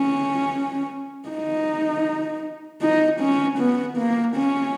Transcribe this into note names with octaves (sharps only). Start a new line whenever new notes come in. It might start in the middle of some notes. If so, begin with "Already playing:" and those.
Already playing: C#4
D#4
D#4
C#4
B3
A#3
C#4